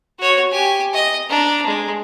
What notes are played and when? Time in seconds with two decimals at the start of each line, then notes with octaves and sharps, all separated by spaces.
0.20 F#4 C#5
0.51 G4 G#5
0.93 D#5
1.29 D4 A#5
1.66 G#3